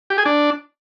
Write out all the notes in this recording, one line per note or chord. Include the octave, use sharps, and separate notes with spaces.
G4
G#4
D4